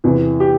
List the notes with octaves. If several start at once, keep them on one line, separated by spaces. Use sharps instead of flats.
E2 C3 E3
G4